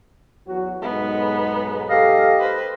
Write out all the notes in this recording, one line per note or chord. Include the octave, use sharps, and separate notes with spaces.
E2 F#3 F#4
B1 G#2 G#3 B3 D#4
G4 A4 D#5 F5
B4 C5